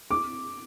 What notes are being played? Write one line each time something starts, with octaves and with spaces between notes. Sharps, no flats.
D6